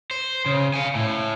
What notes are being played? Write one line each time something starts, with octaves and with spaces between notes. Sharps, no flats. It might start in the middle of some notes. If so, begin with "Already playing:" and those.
C5
C#3
F5 G#5
A2